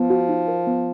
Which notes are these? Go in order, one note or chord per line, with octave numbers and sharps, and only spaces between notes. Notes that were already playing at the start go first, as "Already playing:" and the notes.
Already playing: F3 B3
F#4
D#4
A#4
B3